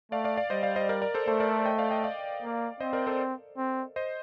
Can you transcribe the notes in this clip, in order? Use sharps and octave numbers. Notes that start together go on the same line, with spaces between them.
A3 D5 F5
D5 F5
D5 F5
G3 C5 D#5
D5 F5
C5 D#5
A#4 D5
A#4 D5
A4 C5
A3 A4 C5
A#4 D5
D#5 G5
D5 F5
D#5 G5
D5 F5
A#3
C4 C5 D#5
A#4 D5
A4 C5
C4
C5 D#5